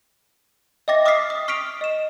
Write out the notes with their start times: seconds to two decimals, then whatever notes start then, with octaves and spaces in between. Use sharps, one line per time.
0.88 D#5 E5 G5 D6 A6 A#6
1.06 D6 D#6 F6 A6 B6 C7
1.30 D#6
1.48 C#6 F6 B6 C7 D7 F7
1.81 D#5 E7